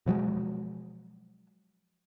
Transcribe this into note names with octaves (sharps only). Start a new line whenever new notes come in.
B2 F3 F#3 G#3